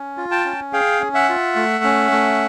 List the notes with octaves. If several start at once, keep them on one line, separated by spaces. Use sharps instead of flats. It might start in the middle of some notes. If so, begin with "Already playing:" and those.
Already playing: C#4
F4
G5 A5
C#4
G#4 F5 G5
C#4
E5 F#5
F4
A3
C#4
A3